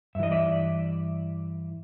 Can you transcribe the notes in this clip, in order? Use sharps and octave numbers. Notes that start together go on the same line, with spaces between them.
G2 E3 D#5 E5
D5 E5